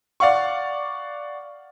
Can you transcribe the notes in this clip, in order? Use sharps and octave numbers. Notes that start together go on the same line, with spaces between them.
D5 F5 F#5 C#6